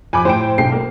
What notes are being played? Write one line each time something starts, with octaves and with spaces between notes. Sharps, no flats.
F2 G#5 B5 D6
A2 C5 G5 D7
B1 G5 C7
A#3